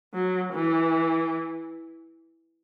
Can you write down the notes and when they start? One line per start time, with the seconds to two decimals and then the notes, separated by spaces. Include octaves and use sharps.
0.14 F#3
0.53 E3